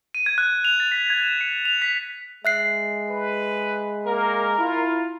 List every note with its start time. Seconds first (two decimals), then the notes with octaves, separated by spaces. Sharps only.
0.15 D#7
0.26 G#6
0.38 F#6
0.65 F7
0.80 A6
0.92 B6
1.10 G#6
1.23 E7
1.41 C#7
1.65 F7
1.82 B6
2.45 G#3 E5 F#6 C7
3.09 B4
4.06 A#3 A#4
4.59 E4 F4